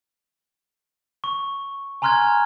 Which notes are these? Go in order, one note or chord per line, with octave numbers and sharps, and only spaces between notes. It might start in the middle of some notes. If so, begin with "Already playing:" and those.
C#6
G#5 A#5 C6 F6 F#6 G#6